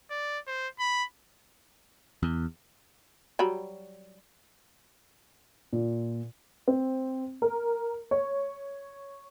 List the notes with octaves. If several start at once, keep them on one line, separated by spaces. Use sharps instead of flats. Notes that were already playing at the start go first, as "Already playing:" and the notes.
D5
C5
B5
E2
F#3 G3 B5
A#2
C4
A#4
C#5